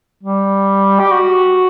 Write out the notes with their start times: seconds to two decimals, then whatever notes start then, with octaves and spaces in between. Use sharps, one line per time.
0.23 G3
1.00 G4
1.12 F#4